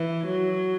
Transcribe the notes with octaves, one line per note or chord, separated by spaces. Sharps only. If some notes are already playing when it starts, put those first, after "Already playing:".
Already playing: E3
F#3